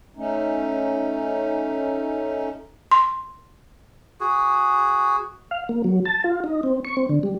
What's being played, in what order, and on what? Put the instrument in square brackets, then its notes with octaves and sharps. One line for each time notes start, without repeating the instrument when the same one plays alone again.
[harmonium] A3 C#4 D#4
[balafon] C6
[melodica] F#4 G#4
[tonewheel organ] F5
A#3
F#3
A5
F4
D#4
C4
C#6
C4
D3
G3